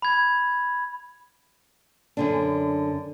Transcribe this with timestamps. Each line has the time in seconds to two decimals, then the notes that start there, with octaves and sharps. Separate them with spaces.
0.02 B5 G#6
2.17 F#2 D3 D4